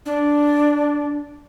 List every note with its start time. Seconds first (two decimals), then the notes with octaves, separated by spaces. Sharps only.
0.06 D4